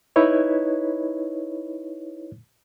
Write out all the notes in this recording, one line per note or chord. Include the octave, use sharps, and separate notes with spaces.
D#4 E4 B4 C#5 D#5